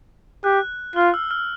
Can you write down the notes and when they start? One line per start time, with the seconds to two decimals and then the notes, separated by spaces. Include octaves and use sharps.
0.44 G4 F#6
0.96 F4 F6
1.14 E6
1.31 F6